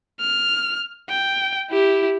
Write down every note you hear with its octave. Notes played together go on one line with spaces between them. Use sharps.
F6
G5
E4 G4